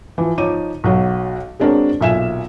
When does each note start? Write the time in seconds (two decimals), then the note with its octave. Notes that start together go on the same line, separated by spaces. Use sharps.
0.18 E3 F3
0.38 F3 D#4 C#5 D6 D#7
0.84 B1 F#3 C#5
1.60 G#3 C4 D4 F#4 A#4 C#5
2.01 B1 A#2 E5 G#5 E7